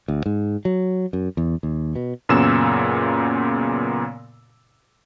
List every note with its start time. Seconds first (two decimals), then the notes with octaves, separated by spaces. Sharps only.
0.08 D2
0.26 G#2
0.65 F#3
1.13 F#2
1.37 E2
1.63 D#2
1.96 B2
2.29 F#2 A#2 C#3 B3 E6 E7